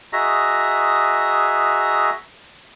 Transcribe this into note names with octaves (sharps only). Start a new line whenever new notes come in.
F#4 G#4 D#5 E5 A#5